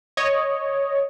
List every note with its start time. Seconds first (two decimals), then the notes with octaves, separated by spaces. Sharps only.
0.17 C#5 D#5